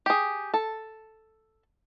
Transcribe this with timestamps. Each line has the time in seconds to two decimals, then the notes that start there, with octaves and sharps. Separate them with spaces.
0.06 G4 G#4
0.54 A4